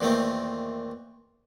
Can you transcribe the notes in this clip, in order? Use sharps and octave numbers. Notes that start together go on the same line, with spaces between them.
E2 A#2 D#3 A3 A#3 C4